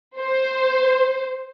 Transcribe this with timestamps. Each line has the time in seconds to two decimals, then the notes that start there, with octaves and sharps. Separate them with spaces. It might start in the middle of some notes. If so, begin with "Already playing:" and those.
0.20 C5